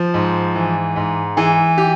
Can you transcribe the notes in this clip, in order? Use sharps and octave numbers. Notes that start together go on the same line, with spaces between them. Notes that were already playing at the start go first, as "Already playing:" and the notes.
Already playing: F3
G#2
E3
G#2
E3 G#4
G4